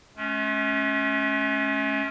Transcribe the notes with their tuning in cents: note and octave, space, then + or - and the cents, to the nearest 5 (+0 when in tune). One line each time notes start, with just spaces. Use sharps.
A3 -45 C#4 +0